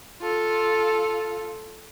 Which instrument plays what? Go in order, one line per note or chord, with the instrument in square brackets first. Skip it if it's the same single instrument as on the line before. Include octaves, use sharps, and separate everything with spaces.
[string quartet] F4 A4